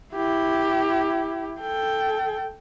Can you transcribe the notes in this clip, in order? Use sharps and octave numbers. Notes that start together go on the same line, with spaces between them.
E4 G4
A4 G5